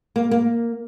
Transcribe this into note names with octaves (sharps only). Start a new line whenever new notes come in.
A#3
A#3